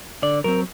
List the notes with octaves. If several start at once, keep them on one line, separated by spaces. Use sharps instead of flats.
D3 D5
F#3 C4 A#4